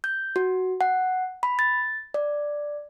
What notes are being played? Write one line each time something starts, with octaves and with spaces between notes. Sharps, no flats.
G6
F#4
F#5
B5
A6
D5